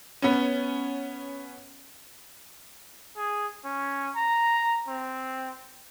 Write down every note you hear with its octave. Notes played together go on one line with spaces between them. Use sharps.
B3 C#4
G#4
C#4
A#5
C4